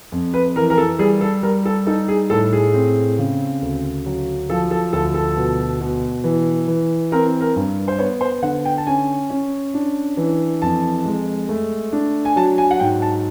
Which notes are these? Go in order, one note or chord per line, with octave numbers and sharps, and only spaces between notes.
F2
B4
E3 A#4
A#4
A4
G3 G#4
A4
G3 A#4
A4
D#4 A4
G#4
A2 A4
G#4
C4
C#3
D2
F#3
F3 A4
A4
D2 A4
A4
B2
B2
E3
E3
C4 A#4
A#4
G2
C5
B3 C#5
C5
D3 F#5
G5
A5
C#4 G#5
C#4
D4
E3
F2 A5
G#3
A3
D4
G#5
F#3 A5
G#5
F#5
G#2 G5
A5